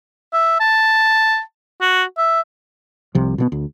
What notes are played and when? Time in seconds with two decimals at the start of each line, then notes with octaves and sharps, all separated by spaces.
0.33 E5
0.60 A5
1.81 F#4
2.17 E5
3.15 C2 C3 F3
3.38 B2 D3 B3
3.52 D2